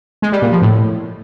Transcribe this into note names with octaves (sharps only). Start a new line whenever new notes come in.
G#3
G3
A#2
F3
A2